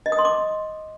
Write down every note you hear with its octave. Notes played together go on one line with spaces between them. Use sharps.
D#5
D#6
C6
D6